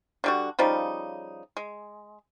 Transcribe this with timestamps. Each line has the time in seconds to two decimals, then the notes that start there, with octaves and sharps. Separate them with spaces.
0.24 D3 G3 F#4
0.59 C#3 F3 G3 D#4
1.57 G#3